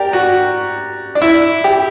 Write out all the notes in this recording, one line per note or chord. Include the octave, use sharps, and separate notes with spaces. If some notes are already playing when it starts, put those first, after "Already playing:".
Already playing: G4 A#4 D5
F#4
D4
E4
G4